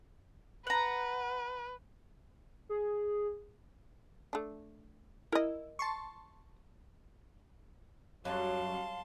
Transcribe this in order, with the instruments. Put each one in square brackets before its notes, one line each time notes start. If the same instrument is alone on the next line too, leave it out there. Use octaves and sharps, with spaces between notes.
[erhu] B4 [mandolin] F#5 A#5
[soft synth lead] G#4
[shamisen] A3 D4
[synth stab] E4 [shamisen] A#4 D#5
[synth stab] A5 C6 C#6
[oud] F#2 [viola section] F#3 G3 [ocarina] F5 [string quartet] A5 C6